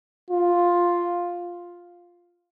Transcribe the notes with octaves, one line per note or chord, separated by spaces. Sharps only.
F4